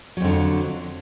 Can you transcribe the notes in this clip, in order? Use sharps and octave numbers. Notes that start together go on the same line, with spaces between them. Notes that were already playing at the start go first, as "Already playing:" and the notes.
F2 D3 F#3